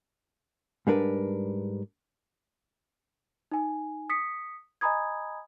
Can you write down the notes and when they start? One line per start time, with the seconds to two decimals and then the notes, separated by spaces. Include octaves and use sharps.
0.87 G#2 G3 D4 A#4 B4
3.52 D#4 G#5
4.10 D#6 B6 C#7
4.81 D#5 G#5 A#5 B5 D#6 G#6